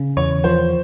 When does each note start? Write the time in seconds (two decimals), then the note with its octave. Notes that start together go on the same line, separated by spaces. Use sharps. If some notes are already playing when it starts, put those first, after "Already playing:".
Already playing: C#3
0.17 E2 C#5
0.44 F3 C5